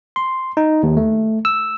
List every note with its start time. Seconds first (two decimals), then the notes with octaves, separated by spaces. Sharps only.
0.16 C6
0.57 D#4
0.83 D#2
0.97 A3
1.45 E6